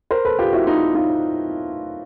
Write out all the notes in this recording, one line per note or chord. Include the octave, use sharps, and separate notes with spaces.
A#4 C5
A4 B4
F4 G4
E4 F#4
D#4 F4
D#4 F4